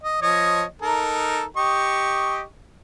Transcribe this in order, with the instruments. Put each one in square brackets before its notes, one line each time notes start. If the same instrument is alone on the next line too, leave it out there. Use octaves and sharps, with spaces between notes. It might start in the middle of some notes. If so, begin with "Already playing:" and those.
[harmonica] D#5
F3 C#5 D#5
D#4 A4 A#4
G4 D#5 C#6